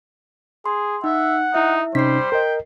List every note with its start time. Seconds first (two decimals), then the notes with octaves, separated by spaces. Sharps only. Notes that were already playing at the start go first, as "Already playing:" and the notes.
0.66 G#4 C6
1.04 D#4 E5 F#5
1.54 D#4 E4 E5
1.95 C3 G3 C#4 D#4 C5 B6 C7
2.32 A#4 D#5 G5